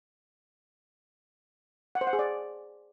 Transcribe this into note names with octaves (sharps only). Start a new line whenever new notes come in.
F#5
C5
F#5
G#4
D5